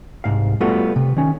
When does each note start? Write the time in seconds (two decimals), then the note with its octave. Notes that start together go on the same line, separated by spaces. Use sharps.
0.24 C2 G#2 F5
0.61 G3 A3 B3 F4 F#4 A4
0.96 C3
1.16 D#3 C#4